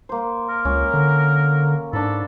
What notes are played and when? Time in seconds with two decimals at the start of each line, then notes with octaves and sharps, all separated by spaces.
0.09 A#3 C5
0.49 A#4
0.65 C#2 C#4
0.94 D3
1.93 G#2 D4 A4 B5